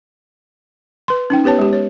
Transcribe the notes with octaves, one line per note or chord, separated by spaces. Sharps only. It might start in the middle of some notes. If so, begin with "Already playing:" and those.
B4 C6
C#4 D#4 G5
B3 G4 B4 C#5 A5
G#3 G4
C#5